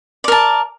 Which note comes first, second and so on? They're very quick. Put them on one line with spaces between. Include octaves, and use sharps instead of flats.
D5 A#4 A5